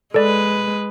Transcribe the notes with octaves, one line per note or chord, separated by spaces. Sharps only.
G#3 A4 B4 D5